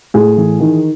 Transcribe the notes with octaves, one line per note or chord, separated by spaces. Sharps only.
A2 G#4
E3
D#3